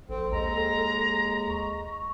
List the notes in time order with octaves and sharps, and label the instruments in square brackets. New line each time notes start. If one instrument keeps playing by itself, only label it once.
[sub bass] A#1 [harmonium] C4 [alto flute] A4
[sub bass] D#2 [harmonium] G#3 [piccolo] A#5
[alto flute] C#6